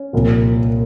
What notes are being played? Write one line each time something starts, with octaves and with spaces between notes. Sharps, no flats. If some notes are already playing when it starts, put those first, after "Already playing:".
Already playing: C#4
C2 A#2 F3